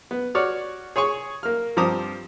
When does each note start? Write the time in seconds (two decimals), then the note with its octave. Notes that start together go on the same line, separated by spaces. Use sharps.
0.11 B3
0.35 F#4 C#5 D5 F6
0.96 G#4 C#5 G#5 C#6
1.43 A#3 F6
1.77 G2 F3 C4 A#5 D6 D#6